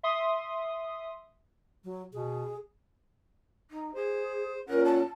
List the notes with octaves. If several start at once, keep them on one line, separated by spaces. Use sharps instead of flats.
E5 C6 D#6
F#3
B2 G#4
D#4
G#4 C5
A#2 C#4 A#4 F#5
A5